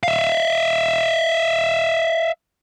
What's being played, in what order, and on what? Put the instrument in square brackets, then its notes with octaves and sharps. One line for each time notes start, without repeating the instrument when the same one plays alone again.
[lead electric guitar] E5 F5